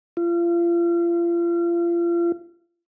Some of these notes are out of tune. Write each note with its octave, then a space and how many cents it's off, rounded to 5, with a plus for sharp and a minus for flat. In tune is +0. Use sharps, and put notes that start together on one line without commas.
F4 -35